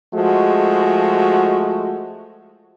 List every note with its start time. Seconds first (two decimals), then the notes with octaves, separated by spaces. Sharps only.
0.14 F3 G#3 A3 F#4